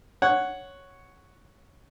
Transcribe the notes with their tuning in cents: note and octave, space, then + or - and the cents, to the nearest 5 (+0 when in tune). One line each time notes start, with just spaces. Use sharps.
C#5 +0 F#5 +0